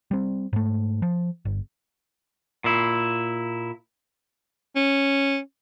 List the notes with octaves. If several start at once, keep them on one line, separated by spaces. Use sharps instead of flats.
G3 C4
G#2 A3
F3
G1
A#2 E4
C#4